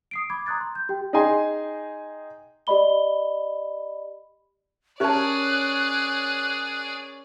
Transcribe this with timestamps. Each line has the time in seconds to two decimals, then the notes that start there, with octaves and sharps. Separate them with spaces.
0.11 D#6 C7 D7
0.30 B5 D6 G#6
0.46 A#5 C6 D#6 F#6 G#6 A6
0.61 C6
0.75 G6
0.89 G4 G5
1.13 D#4 G#4 D#5 G5 G#5 C6
2.67 G4 D5 D#5 B5 G7
5.00 C#4 G4 G#4 A#4 C#5 D5 A5 F#6